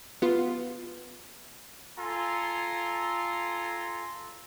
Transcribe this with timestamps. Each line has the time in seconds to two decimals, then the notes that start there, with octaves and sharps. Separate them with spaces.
0.22 B3 F4
1.99 F4 A4 G#5 A#5 C6